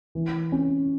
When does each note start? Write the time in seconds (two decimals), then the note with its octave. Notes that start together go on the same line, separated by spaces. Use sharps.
0.15 E3
0.52 C#4